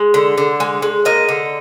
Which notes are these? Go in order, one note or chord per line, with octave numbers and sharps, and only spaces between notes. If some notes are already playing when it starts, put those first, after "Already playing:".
Already playing: G#3
D3
D3
G#3
G#3
A#3 D#5
D3